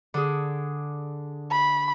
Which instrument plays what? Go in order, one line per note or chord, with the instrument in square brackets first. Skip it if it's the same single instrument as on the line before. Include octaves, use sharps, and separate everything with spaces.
[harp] D3 G#4
[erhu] B5